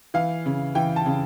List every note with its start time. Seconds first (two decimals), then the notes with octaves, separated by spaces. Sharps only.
0.14 E3 F5
0.46 C#3
0.75 E3 G5
0.96 A5
1.06 C#3